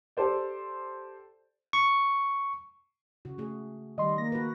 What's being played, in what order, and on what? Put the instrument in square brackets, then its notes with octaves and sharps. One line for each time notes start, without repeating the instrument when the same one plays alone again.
[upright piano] G4 A4 C5 D5
[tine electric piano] C#6
[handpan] C#3 F#4
A3 G#4
[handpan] D#3 [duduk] G3 [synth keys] D#5 C6
[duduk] A#3 [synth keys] A#6
[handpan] F#4 B4